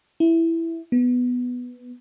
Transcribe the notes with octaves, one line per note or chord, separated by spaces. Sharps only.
E4
B3